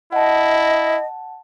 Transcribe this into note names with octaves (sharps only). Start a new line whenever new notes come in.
E4 D#5 F#5 A5